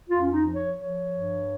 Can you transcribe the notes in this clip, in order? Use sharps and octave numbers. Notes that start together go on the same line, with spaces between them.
F2 F4
C#4
D#4
F3
C#5
F3 C#5
G2